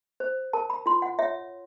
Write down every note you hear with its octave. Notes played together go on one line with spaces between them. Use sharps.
C5
A#4 A5
B5
F4 C6
F#5
C#5 E5